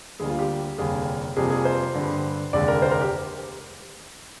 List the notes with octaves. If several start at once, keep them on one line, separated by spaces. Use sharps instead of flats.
D2 D3 G3 A#3 G#4
F4
G4
F1 D#2 D3 G3 A#3 G#4
F2 C3 G3 A#3 G#4
G#4
C5
G2 D3 G3
F1 D#2 D3 G#3 D5
A#4
C5
A#4
G4